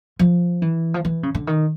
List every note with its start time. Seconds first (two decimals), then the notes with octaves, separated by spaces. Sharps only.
0.19 F3
0.62 E3
0.94 F3
1.05 E3
1.23 C#3
1.35 D3
1.47 D#3